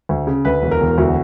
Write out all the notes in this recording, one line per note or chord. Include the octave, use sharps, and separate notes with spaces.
D2
C#3
D2 B4
E1
A#4
E1
D2 F#4